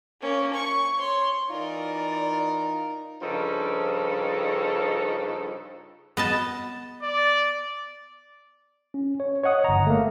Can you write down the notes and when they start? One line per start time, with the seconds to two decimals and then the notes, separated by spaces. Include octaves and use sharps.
0.21 A#3 C#4
0.54 C#6
0.99 C#5 C6
1.50 E3 D#4 F4 A#4 D5
3.22 G2 C#3 F3 D#4 A4
6.17 B3 D#5 A5
7.02 D5
8.94 C#4
9.20 C#5
9.44 C#5 D#5 F#5 D#6
9.64 G1 A#5
9.87 A3 A#3